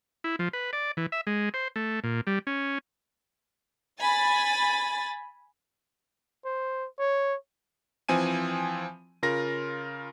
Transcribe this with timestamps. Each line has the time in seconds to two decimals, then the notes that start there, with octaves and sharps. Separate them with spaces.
0.24 E4
0.39 F3
0.53 B4
0.73 D5
0.97 E3
1.12 E5
1.27 G#3
1.54 C5
1.76 A3
2.04 A#2
2.27 G3
2.47 C#4
4.00 G#5 B5 A6
6.45 C5
6.99 C#5
8.09 E3 F3 C4 G#5 D#7
9.23 C#3 F4 A#4 A#6